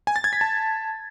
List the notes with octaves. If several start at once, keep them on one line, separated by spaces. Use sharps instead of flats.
G#5
A6
G#6
B6
A5